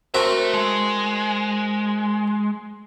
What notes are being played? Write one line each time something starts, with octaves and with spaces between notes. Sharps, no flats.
C4 F#4 A#4 E5 A5
G#3